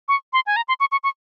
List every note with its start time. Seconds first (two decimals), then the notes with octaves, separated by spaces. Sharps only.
0.08 C#6
0.33 C6
0.46 G#5
0.56 A#5
0.68 C6
0.80 C#6
0.92 C#6
1.04 C#6